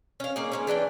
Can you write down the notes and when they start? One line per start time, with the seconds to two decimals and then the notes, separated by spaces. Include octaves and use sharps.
0.20 C#4 F5
0.36 A#3 C#4 D#4 G#4
0.52 G#3 A#3 C#4
0.67 E3 D4 D5 G5